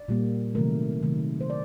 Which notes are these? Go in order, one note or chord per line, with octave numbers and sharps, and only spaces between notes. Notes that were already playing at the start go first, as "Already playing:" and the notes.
Already playing: D5
A#2 G3 A#3
C3 D#3 F#3 A3 A#4
C3 D#3 F#3 A3
C5
D5